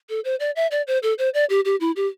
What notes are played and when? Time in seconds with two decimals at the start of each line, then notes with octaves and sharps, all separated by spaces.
0.09 A4
0.25 C5
0.40 D5
0.56 E5
0.71 D5
0.87 C5
1.03 A4
1.19 C5
1.34 D5
1.50 G4
1.65 G4
1.80 E4
1.96 G4